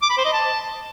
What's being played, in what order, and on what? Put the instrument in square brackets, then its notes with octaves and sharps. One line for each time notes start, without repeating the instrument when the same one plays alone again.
[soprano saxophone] D6
B5
C5
D#5
A5